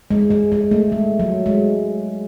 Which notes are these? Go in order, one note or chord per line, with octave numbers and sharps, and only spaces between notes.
G#3
G#3
G#3
A3
G#3
F#3
G#3